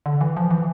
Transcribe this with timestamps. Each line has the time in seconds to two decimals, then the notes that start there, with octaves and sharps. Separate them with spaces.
0.06 D3
0.21 E3
0.37 F3
0.51 E3